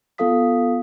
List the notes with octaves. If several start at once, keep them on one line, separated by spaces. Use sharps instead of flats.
B3 F4 A4 F5 D#6 B6